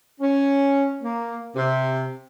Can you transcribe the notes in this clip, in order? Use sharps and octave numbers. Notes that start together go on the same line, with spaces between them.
C#4
A#3
C3